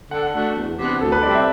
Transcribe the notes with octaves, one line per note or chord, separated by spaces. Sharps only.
D3 F#5
A3 D4 F#4
E2
C3 E3 B3 D4
D2 A4
B4
C3 G3 C4 E4 D5
E5